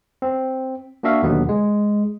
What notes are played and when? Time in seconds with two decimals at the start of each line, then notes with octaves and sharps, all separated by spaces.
0.22 C4
1.03 A#3 D4 F#4 E5 F5
1.22 D#2 B2 D3 F#3 B3
1.49 G#3